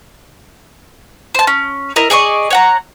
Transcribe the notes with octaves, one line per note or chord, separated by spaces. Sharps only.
C5 A5
C#4
E4 A#4 D#5
G#4 D5 D#5 C#6
C#5 F#5 A#5